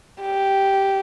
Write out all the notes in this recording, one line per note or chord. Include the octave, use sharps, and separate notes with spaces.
G4